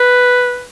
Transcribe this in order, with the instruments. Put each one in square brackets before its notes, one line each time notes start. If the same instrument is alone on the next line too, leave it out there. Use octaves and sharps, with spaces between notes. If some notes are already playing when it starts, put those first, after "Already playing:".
Already playing: [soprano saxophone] B4